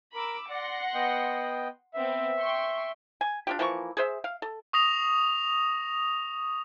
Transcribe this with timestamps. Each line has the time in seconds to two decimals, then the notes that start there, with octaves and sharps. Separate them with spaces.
0.15 A#4 B5 D6 E6
0.50 D5 F#5 C6 A#6
0.94 B3 D#5 G5
1.94 B3 C4 E5
2.38 G5 C6 C#6
3.21 G#5
3.47 D4 F4 G4
3.59 E3 F3 A#3 C#6
3.97 G#4 C5 E5
4.24 F5
4.42 A4
4.73 C#6 D#6 A#6 F7